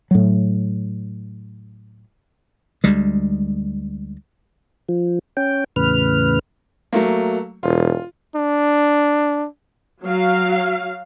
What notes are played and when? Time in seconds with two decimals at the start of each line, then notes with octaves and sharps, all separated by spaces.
0.11 A2 F#3
2.84 D2 G3 G#3
4.89 F3
5.37 C#4 G5
5.76 E2 A2 C#3 B4 F6
6.93 F#3 A3 A#3
7.63 E1 F4
8.35 D4
10.04 F#3 F5